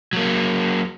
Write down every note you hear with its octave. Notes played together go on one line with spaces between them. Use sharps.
F#3 A#3